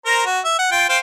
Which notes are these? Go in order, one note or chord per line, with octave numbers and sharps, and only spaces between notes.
A#4 C5 A#5
F#4
E5
F#5
F4 G5
C5 F5 G5